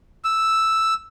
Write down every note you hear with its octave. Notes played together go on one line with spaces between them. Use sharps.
E6